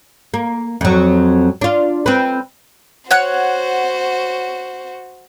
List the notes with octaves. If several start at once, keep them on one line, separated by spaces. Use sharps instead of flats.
A#3
F2 F#3
D4 F4
C4 B4
F#4 C5 C#5 F#5 F#6